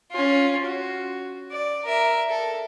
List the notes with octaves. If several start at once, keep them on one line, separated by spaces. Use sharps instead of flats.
C#4 F4
F#4
D5
A#4 E5
A4